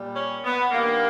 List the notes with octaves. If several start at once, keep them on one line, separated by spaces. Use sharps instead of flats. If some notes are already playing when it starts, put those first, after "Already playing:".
Already playing: A#2 G3
C#4
B3
G2 D#3 G3 A#3